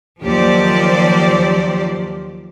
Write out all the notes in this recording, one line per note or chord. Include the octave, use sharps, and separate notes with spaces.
D#2 F3 F#3 G4 C5 D5